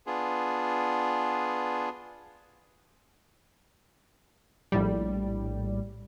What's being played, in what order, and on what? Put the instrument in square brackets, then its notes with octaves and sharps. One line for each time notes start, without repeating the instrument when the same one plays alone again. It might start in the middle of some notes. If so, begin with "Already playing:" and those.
[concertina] B3 D4 F4 G#4
[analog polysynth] A#1 A2 G3